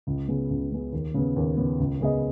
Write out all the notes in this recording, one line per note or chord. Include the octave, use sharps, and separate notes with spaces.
C#2
C#3 B3 G#4
C#2
C#3 B3 G#4
D#2
C#3 B3
D#2
C#3 B3
C#2
C#3 B3 G#4 D#5